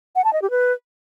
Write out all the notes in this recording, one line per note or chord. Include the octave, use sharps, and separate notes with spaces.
F#5
A5
D#5
G4
B4